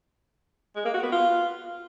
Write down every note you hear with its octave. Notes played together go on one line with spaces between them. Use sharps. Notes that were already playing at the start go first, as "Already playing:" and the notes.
G#3
A#3
F#4
B3
F4